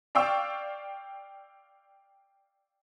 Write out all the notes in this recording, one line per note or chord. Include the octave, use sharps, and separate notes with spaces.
D5 F5 G5 C#6 E6